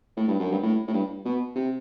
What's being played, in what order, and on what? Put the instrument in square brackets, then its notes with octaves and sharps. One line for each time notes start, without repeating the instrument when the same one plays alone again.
[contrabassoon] A2
G2
F#2
G2
A2
A2
G2
B2
C3